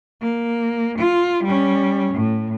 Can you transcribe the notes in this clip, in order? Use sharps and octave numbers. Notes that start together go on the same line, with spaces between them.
A#3
F4
G3 C#4
A2